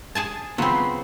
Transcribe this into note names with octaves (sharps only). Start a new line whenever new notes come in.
G#4 G#5 A5
C#3 F#3 B3 C4 F4 B5 C6